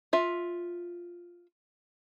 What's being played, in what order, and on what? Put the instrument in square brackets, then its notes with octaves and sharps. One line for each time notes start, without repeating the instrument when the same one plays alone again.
[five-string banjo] F4 E5